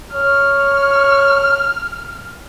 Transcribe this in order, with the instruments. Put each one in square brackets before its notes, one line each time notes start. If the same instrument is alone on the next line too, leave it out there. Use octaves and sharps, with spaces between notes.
[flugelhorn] C#5 [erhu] F6